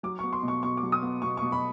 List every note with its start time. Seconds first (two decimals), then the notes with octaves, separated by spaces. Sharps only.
0.03 F#3 D6
0.19 B3 C#6
0.33 C6
0.43 B2
0.48 C#6
0.63 B2 C#6
0.77 D6
0.83 F#3
0.92 D#6
1.02 B3
1.22 B2 C#6
1.37 B2 C#6
1.52 B5